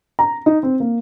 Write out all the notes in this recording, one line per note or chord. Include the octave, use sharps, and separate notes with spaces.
A#5
D#4
C4
A#3